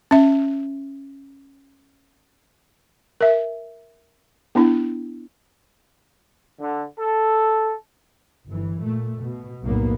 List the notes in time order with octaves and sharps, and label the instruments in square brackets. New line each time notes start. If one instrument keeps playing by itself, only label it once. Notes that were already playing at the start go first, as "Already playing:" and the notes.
[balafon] C#4 E5
A#4 E5
B3 D4 E4
[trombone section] D3
A4
[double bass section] G1 E3
A#2 A3
B2
F1 B1 A2 F#3 A#3 B3